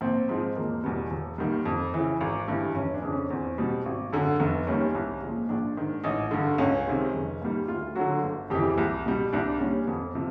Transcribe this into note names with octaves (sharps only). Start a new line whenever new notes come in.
A#1 C4
G#2 F3 G#3
E1 A#3
E2 B2 G3 B3
E1
D#2 D#3 G3
F2
C#3 E3
G#1
G2 E3 G3
F1 C#4
D4
F2 C#3
C#4
E2 C4
B2 G3
G#1
F#2 D3
F1 B3
D#2 D#3 G3 C#4
C2
A#2 F3 G#3
A#1 D4
G#2 D#3
A1 D#4
G2 D3
C#2 C#4
C3 D#3 G#3
F1
D#2 D#3 G3
D2 F4
D3 F#3 F#4
G1
F2 C#3 E3 G4
C2
B2 G3
C2 D4
A#2 G3 C#4
F2 B3
C3 F3